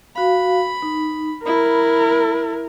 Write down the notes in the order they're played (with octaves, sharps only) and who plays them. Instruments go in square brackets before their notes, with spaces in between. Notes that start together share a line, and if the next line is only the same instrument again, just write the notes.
[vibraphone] F#4 F5 [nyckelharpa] B5
[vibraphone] D#4
[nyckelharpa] E4 [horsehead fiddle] A#4 [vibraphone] B5